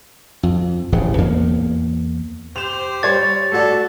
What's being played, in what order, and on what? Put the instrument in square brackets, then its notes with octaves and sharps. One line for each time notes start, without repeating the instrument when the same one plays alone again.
[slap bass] F2
D1 A1 A2 C#3
E2 A#3
[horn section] G4 C5 [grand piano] E7 F7
[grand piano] G3 C#5 G#6 [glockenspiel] A6
[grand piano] A3 F#4 D5 [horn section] A4